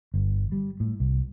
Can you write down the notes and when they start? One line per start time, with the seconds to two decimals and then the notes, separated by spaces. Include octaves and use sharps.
0.14 G1
0.52 G3
0.80 A2
1.00 C2